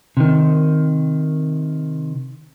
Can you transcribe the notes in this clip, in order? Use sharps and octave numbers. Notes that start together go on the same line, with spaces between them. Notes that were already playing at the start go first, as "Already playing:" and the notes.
C3 D#3